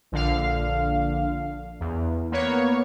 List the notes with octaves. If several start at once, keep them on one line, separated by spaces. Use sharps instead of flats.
A#1 D3 F5
E2
A#3 B3 C#5